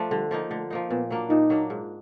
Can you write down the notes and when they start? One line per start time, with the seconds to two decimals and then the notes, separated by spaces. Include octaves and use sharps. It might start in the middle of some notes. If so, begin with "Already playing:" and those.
Already playing: F3 A3 D4
0.11 D3 G3
0.31 F3 A#3 D#4
0.50 D3 A3
0.70 F3 A#3 D#4
0.90 A#2 B3
1.10 F#3 A#3 D4
1.30 A#2 D#4
1.50 F#3 A#3 D4
1.70 G#2